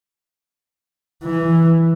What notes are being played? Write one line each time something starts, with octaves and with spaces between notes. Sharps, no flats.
E3